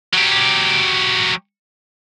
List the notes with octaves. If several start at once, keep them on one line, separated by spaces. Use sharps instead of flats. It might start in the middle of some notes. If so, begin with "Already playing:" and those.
F#3 G4